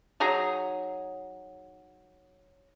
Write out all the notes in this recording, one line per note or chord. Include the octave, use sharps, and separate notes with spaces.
F#3 D#4 G#4 A#5